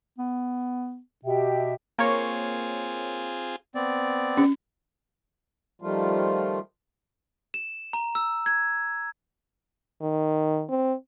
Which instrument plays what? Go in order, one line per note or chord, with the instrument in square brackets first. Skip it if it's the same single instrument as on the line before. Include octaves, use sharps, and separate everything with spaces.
[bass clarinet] B3
[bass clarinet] B2 [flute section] G4 E5 G5
[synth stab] A#3 C#5 [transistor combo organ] C4 F4 G#4
[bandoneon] B3 C4 D5
[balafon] C#4
[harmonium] D#3 F3 G3 A3 F4
[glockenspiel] E7
A#5
E6
G#6
[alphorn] D#3
C4